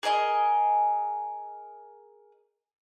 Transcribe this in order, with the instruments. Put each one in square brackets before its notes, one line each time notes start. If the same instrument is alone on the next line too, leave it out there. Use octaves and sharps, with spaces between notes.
[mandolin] G#4 A#4 D#5 G#5